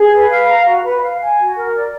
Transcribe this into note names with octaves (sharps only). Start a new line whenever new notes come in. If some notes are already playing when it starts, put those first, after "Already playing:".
Already playing: G#4
B4
F5
A#5
F#4
B4
F5
G#5
F#4
A#4
D5